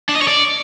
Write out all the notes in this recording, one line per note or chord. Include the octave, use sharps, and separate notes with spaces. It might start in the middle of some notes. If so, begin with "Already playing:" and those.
D4
D#5
C#5
D5